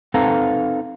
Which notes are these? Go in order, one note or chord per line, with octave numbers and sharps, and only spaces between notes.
C4 D#4 A4 B4 F5 A#5